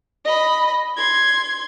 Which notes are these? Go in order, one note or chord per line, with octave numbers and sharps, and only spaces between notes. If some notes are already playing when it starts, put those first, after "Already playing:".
D#5 B5
C6 G#6